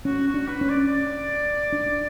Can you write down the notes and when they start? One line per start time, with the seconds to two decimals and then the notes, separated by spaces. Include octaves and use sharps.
0.05 C#4 F#4
0.27 F#4
0.34 D4
0.48 B4
0.61 C#4
0.69 D5
0.85 D5
1.72 D4